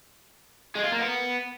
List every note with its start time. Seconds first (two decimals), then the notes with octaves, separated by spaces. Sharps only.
0.76 G#3
0.84 F4
0.92 A#3
1.00 B3